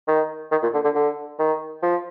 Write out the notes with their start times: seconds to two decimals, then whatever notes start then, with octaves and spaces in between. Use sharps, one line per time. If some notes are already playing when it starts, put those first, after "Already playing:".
0.08 D#3
0.51 D#3
0.62 A#2
0.74 D3
0.84 D3
0.95 D3
1.39 D#3
1.83 F3